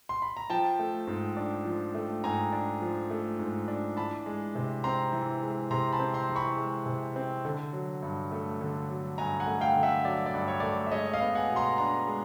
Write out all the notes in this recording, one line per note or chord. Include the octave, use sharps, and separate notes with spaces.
C6
B5
A#5
F3 G5 A5
A3
G#2
D4
F3
A3
G#2 G#5 A#5
D4
F3
A3
G#2
D4
E3 A5 B5
G#3
C3
C4 A#5 C6
E3
G#3
C3 A#5 C6
A5 B5
C4
A#5 C6
E3
B5 C#6
G#3
C3
C4
D3
F#3
G2
A3
D3
F#3
G2 G#5 A#5
F#5 G#5
A3
F5 G5
D3
E5 F#5
F#3 D5
D5
G2
C#5
A3 D5
C#5
E5
G#3 C#5 D#5
D#5 F5
B3
F#5 G#5
B2
A#5 C6
D4 A#5 C6
G#3